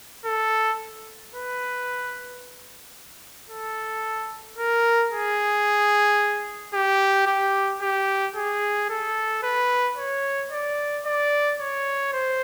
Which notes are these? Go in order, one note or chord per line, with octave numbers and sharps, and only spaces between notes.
A4
B4
A4
A#4
G#4
G4
G4
G4
G#4
A4
B4
C#5
D5
D5
C#5
C5